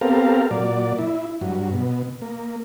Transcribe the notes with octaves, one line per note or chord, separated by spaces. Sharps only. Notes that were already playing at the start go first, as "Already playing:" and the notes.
B3 C4 G4 A4 A#4 F5
A#2 F#3 D5
E4
G2 F#3
B2
A#3